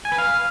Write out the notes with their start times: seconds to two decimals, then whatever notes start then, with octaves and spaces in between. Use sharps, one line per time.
0.05 G#5
0.12 B4
0.18 F5